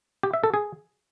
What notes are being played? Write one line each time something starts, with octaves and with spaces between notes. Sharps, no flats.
G4
E5
A4
G#4